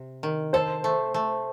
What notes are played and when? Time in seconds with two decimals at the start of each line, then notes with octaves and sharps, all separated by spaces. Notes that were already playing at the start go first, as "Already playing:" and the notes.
Already playing: C3
0.23 D#3
0.53 A4 C5
0.84 A3
1.14 A3